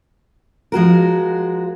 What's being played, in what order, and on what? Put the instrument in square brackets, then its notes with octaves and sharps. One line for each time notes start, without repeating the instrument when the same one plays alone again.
[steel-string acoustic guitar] F3 G#3 F#4 A#4